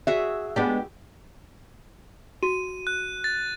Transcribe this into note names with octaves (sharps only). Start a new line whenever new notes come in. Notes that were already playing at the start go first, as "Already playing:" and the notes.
F#4 G#4 E5
G#3 B3 D4 G4
F#4 D#7
F#6
A6